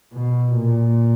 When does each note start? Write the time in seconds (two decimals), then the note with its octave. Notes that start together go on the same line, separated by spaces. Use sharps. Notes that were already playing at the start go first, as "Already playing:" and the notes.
0.14 B2
0.57 A#2